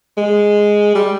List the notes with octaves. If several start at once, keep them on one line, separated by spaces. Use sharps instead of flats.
G#3
G3